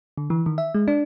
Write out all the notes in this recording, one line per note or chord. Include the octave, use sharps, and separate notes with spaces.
D3
E3
D#3
E5
G#3
D4